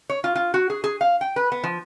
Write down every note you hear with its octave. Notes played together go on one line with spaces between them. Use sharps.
C#5
F4
F4
F#4
G#4
G#4
F5
G5
B4
B3
F3